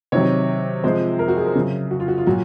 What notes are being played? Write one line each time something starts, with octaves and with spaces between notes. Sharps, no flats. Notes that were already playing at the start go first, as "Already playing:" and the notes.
C3 D#3 F#3 C#5
C3 F3 G#3 C5
A#4
F#4
G#4
A#4
C#3 F#3
F#4
F4
F#4
F4
A#2 F#3 F#4